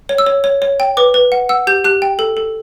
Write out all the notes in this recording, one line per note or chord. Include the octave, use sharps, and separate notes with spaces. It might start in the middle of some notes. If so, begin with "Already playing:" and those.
C#5
E6
C#5
C#5
C#5
G5
B4 D6
B4
F#5
F#5 E6
G4 G6
G4 F#6
G5
A4
A4